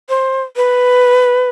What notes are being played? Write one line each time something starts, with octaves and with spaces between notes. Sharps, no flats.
C5
B4